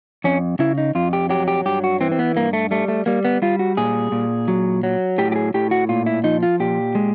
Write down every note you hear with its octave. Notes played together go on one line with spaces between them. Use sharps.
F2 C#4
C#3 E4
D#4
F2 F4
G4
F#3 G4
G4
G2 G4
F#4
E3 C4
C4
B3
G2 A#3
A3
G3 A3
A3
G3 A#3
B3
G3 F4
F#4
A#2 G#4
A#2
F#3
F#3
A2 G4
G4
G#4
A2 G4
F#4
A#2 F4
E4
F3 D#4
F4
A#2 G4
G#3